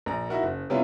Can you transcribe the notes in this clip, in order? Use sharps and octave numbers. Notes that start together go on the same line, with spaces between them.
A#1 A#5
D#4 E4 F#4 A#4
F#1
C3 G3 B3 C#4 E4 F4